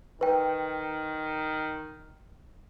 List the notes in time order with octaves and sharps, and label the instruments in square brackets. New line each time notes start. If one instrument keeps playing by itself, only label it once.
[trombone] D#3 [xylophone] B4 G5